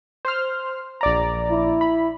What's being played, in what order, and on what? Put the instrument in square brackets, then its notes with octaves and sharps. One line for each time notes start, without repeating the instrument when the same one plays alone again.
[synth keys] C5 C6 F6
A#1 D5 A#5
[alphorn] E4
[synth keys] B5